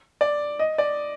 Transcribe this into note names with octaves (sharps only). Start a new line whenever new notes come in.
D5
D#5
D5